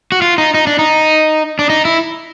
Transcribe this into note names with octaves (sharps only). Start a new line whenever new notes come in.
F#4
F4
D#4
D#4
D4
D#4
D4
D#4
E4